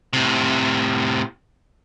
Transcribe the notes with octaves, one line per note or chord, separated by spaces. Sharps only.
A2 C3